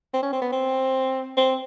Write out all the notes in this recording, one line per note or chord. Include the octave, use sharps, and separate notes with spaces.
C4
C#4
C4
B3
C4
C4